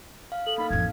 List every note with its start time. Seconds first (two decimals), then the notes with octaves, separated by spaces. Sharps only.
0.32 F5
0.47 A4 F#7
0.58 A#3 D#4 F5 B5
0.71 A1 F2 G#6